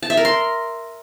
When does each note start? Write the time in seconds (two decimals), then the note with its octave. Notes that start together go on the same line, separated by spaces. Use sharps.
0.03 A5
0.10 E5
0.17 A#4
0.25 C6